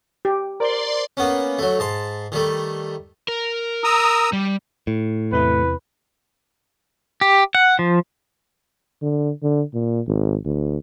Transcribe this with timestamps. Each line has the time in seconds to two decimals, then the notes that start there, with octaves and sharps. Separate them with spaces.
0.25 G4
0.60 A#4 C5 D5 C6
1.17 A#3 B3 C#4
1.59 F#3 A3
1.79 G#2 A5 C6
2.32 D#3 G3 A3
3.28 A#4
3.84 A#5 D#6 E6
4.33 G3
4.87 A2
5.32 E2 C3 E4 B4
7.21 G4
7.55 F#5
7.79 F3
9.02 D3
9.43 D3
9.74 A#2
10.07 G#1
10.45 D2